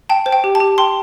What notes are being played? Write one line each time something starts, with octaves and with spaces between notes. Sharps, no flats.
G5 A5
C5
G5
G4
A5
G4
G5 A5 C6